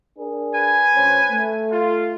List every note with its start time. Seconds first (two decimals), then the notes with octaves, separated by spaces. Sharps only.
0.18 D4 G#4 A#4
0.53 B4 G#5
0.94 D2 C#4 C5
1.31 A3
1.71 F4